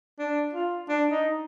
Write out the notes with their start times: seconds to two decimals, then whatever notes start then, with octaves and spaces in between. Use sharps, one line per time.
0.19 D4
0.53 F4
0.89 D4
1.11 D#4